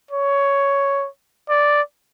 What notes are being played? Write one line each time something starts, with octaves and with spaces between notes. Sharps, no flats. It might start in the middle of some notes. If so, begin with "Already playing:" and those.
C#5
D5